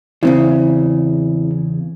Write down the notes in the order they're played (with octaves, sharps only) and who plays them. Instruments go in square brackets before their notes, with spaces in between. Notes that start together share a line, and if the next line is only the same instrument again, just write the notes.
[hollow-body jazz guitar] E2 A2 C#3 [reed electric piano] C4 E4